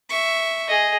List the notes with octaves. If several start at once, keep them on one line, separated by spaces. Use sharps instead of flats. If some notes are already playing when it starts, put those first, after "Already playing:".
E5 C#6
G#4 D#5